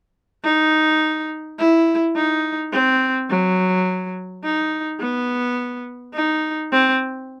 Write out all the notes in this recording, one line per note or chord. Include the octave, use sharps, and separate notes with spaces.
D#4
E4
D#4
C4
F#3
D#4
B3
D#4
C4